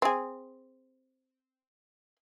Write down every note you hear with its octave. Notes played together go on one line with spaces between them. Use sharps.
C4 G#4